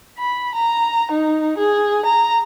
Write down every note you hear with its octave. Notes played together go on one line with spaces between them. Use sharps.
B5
A#5
D#4
G#4
A#5